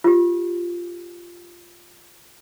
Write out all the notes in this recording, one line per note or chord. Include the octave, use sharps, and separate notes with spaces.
F4 G4